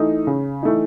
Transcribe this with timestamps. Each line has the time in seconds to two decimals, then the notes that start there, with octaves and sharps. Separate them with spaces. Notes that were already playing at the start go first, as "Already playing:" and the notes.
Already playing: E3 A3 D#4
0.27 C#3
0.63 E3 A3 D#4